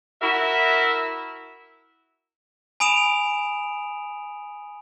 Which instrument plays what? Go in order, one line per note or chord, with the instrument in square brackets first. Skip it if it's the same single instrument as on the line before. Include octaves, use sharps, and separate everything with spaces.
[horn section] E4 F#4 A#4 E5
[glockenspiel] G#5 B5 D#6 D7 E7 F7